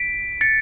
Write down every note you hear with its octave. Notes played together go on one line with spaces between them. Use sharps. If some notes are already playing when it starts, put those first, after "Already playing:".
Already playing: B6 D7
A6 C#7